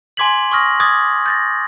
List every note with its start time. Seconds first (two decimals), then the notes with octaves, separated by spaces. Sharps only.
0.17 G#5 C6 D6 G#6 B6 F#7
0.52 C#6 D#6 F6 A#6
0.80 D6 D#6 F#6 G#6 A6
1.26 G6 A6 A#6